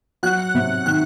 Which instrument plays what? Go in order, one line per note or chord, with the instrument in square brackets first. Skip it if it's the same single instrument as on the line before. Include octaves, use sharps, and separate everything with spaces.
[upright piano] F#3 [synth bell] F#5 F#6
[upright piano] C3
[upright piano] D#3 [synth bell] F#5 F#6